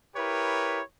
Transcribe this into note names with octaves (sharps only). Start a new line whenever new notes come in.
E4 G4 A#4 B4 C#5